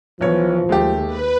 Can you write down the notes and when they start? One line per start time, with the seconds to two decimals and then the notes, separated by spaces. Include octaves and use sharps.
0.21 B1 E3 F3 B3 C#5
0.69 D#2 G#3 A3 G4
1.07 B4